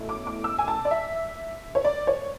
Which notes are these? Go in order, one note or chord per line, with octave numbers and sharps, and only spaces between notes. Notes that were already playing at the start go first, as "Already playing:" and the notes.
Already playing: B2 A3 C#4 E4
D6
D6
E6
G#5
A5
D5
E5
C#5
D5
C#5